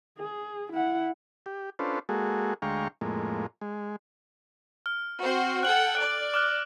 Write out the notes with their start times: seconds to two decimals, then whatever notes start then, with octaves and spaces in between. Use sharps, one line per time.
0.19 G#4
0.72 E4 F#5
1.46 G4
1.79 C#4 D4 F4 A4 B4 C5
2.09 G#3 A#3 F#4 G#4 A4
2.62 D2 G#3 F5 G5 A#5 C#6
3.01 F2 A2 G#3 A#3
3.61 G#3
4.86 F6
5.20 C4 F#4 C5
5.63 A4 F#5 G5 F#6 F#7
5.95 D5 F#6 D7
6.34 D6 F6 F#6